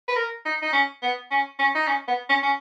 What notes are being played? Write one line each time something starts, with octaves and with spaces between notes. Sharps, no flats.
B4
A#4
D#4
D#4
C#4
B3
C#4
C#4
D#4
C#4
B3
C#4
C#4